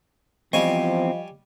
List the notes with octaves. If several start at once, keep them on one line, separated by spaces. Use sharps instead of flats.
E2 F3 G3 C4 D#5 F5 G#5 C#6